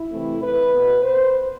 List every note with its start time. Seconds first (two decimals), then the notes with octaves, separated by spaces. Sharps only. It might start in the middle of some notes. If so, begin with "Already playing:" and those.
Already playing: E4
0.11 C3 E3 A3 C4
0.41 B4
0.73 B2 B3
1.03 C5